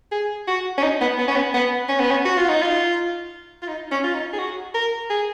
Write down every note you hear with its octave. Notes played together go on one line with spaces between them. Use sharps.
G#4
F#4
C#4
D#4
B3
B3
C#4
B3
B3
C#4
B3
C#4
F#4
F4
D#4
F4
F4
D#4
C#4
F4
D#4
G#4
F#4
A#4
G#4